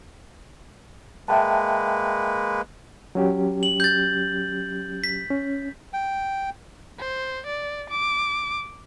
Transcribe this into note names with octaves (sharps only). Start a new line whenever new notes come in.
G#3 A#3 B4 E5 G5 A5
F#3 C#4 G4
F#7
G6 A6
B6
C#4
G5
C5
D5
D6